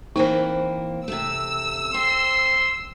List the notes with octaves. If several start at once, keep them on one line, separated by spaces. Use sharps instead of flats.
E3 A#3 C4 D#4 C5
C3 A3 E6
C4 C6